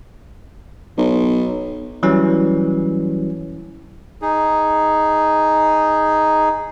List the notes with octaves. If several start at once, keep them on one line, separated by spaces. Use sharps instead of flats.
B1
E3 F#3 G3 C#4
D#4 G#4